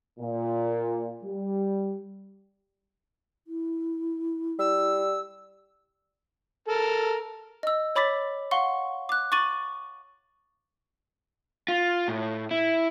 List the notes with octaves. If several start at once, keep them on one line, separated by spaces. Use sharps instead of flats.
A#2
G3
E4
G3 E6
A4 A#4
D#5 E6
C#5 B5 D6 A6 B6
F5 F#5 C6 C#6 G7
D6 F#6
C#6 D6 A6 D#7 F#7
F4
A2
E4